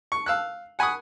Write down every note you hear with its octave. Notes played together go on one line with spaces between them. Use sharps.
C#6
F5 E6 F#6
F#5 G#5 B5 C#6 D#6